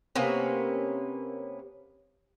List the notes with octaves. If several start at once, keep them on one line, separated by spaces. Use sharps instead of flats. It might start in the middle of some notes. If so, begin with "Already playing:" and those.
C3 A#3 B3 C#4